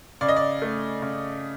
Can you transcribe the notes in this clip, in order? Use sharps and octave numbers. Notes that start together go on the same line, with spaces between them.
C#3 D5
D#5
D5
A3
C#3